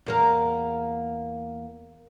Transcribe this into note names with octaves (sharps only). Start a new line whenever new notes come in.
E2 A#3 A#4